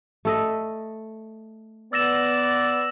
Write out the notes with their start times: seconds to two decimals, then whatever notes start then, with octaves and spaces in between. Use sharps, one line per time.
0.25 A3 A4 D#5
1.93 B3 D5 E6 A#6 E7